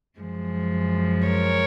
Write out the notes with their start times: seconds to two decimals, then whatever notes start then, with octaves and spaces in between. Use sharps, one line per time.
0.19 F#2 F3 G#3
1.29 A#4 C#5